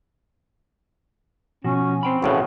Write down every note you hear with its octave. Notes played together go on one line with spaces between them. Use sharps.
B2 F3 C#4 F#4
C4 C5 G5 B5
E2 A2 C#3 F#4